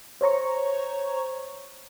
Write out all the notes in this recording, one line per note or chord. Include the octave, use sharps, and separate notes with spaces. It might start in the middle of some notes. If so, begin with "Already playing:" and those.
C5 C#5 A#5 C#6